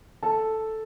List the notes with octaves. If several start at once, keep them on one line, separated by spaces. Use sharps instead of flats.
A4 A5